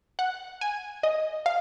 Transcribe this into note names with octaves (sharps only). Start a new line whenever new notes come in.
F#5
G#5
D#5
F5